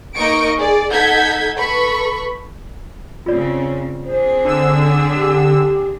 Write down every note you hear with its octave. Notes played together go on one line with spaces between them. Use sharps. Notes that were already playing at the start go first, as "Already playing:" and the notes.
A#3 D#4 D#5 C#6 D7
G#4 D5
D#4 A4 F#5 G6 G#6 B6
A4 B4 B5 C#6
C#3 C4 F4 D5
C4 D4 G#4 C5
D3 E6
G4